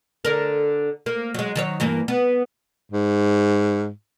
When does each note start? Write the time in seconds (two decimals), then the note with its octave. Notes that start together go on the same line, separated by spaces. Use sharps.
0.25 D3 A#4
1.06 A#3
1.34 F#3 G#3
1.56 D#3 F#3 C#5
1.80 G2 E3 A#3
2.08 B3
2.91 G#2